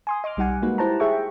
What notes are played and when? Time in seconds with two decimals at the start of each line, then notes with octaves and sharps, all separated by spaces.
0.07 G#5 C6 D#6
0.24 D#5 C6 D6 F6
0.37 B1 G3 D#4 F#5 G#5
0.62 G#3 A#3 D#4 F#4 B4
0.78 E4 G4 C5 F#5 A5 A#5
1.00 G#4 E5 G5 C#6